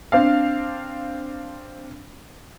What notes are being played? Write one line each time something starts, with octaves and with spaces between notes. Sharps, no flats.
C4 D4 F5